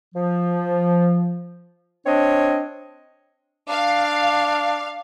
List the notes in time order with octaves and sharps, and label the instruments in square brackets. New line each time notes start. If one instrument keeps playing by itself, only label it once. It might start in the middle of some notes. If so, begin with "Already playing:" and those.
[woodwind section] F3
C4 D4 C#5 D#5
[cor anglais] D4 [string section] F5